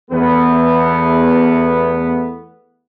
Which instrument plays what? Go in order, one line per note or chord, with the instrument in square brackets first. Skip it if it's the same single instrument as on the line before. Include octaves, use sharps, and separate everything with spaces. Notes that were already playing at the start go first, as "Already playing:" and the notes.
[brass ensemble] E2 A3 B3